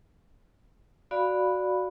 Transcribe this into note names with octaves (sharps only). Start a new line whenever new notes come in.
F#4 D5 F5 B5